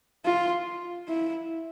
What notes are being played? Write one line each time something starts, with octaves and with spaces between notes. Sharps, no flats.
F4
E4